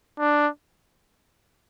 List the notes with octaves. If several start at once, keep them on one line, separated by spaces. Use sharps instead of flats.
D4